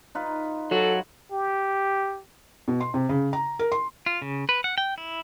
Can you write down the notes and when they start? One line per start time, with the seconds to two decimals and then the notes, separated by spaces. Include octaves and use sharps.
0.15 D#4 F4 B4
0.71 F#3 F#4 A4
1.32 G4
2.68 B2
2.81 C6
2.94 C3
3.09 C#3
3.33 A#5
3.59 A#4
3.72 C6
4.06 F4
4.22 C#3
4.49 B4
4.64 F#5
4.78 G5
4.98 E4